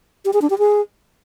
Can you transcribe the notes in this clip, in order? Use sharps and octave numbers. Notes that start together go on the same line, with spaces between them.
G4
G#4
D4
G4
G#4